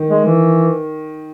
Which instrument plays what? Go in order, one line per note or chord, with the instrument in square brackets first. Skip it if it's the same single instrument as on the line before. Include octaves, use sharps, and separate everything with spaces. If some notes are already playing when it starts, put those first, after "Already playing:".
Already playing: [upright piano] D#3
[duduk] G#3
E3